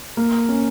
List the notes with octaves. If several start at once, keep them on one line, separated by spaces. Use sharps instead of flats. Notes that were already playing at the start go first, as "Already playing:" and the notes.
A#3
C#4